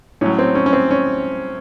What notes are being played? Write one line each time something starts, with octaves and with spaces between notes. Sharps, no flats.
A2 F#3 C#4
C4
C#4
C#4
C4
C#4